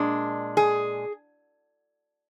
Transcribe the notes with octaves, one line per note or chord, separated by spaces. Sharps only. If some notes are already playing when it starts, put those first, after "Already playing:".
Already playing: A#2 G#3 D4
G#4